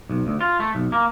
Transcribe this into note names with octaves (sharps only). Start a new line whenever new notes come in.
B1
D2
F4
A3
B1
A#3